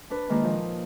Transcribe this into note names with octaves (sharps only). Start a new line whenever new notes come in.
D4 B4
D#3 G#3 A#3 D4 D#4 F4
A#2 F3 D#4